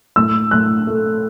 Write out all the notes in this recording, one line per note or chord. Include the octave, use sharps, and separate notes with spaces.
A2 E6
A2 F#6
A3